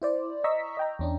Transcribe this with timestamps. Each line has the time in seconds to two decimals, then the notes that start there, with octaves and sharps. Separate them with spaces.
0.02 E4 C5 D5
0.44 D#5 A#5 C#6 E6 B6
0.77 D#5 G5 A#5
0.99 E2 C#4 D4